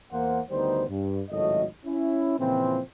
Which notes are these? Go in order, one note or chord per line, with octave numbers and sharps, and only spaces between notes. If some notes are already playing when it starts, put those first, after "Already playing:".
E2 A#3 C5 F#5
D2 D#3 G3 B3 D#4 C5
G2
G#1 C#2 A2 F#3 A3 D#5
C#4 E4
A#2 C#3 E3 F3 C4